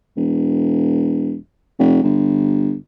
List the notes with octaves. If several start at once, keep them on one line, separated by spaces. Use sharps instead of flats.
E1
F1
G1